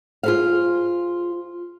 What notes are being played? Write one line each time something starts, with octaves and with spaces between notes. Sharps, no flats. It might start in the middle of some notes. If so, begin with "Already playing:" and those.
F4 G#4 A4 B4 C5 F5